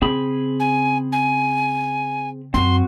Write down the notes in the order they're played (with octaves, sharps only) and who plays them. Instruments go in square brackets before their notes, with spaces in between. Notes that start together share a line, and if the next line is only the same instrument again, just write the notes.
[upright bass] C#3 [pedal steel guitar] C4 G#4 B5
[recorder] G#5
G#5
[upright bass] F#2 [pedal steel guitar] C4 F#4 [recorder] C6